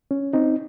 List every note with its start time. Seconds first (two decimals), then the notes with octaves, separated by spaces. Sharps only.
0.11 C#4
0.33 C4 D#4